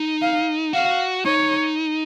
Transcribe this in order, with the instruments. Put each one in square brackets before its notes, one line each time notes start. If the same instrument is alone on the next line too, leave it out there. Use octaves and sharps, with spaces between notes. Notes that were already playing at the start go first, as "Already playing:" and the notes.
Already playing: [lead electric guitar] D#4
[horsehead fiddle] F5
[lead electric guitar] F#4 [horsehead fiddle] F5
[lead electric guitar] D#4 [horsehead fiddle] C#5